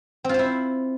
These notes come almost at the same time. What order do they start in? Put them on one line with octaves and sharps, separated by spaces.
C4 F4 C5 E4